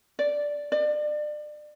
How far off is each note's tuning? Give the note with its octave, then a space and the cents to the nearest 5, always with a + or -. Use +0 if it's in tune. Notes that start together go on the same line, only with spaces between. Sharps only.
D5 -5
D5 +30